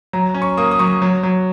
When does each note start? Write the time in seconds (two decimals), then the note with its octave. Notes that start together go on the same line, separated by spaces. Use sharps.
0.13 F#3 A#5
0.34 C#4
0.42 C#6
0.57 A#3 D#6
0.71 D#6
0.79 F#3 C#6
1.02 F#3
1.23 F#3